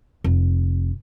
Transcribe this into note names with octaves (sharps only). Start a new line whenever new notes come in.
F1